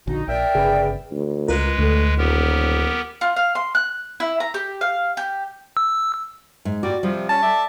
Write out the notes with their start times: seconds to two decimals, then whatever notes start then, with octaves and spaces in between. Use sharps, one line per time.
0.07 A#1 D3 D#4 F#4
0.28 A#1 A#4 D5 E5 G5
0.55 G1 C#3 G#4 B4
1.11 D2
1.48 C#2 G#3 F4 A#4 B4
1.78 D2 A3
2.18 D#1 B3 G4 A#4
3.21 F4
3.36 F5
3.55 C6
3.75 F#6
4.20 E4
4.40 A#5
4.54 G4
4.81 F5
5.17 G4
5.77 E6
6.65 G#2
6.83 A#2 G3 F#4 D5
7.03 C3 F3 G3
7.29 C#4 A5
7.43 A4 D5 E5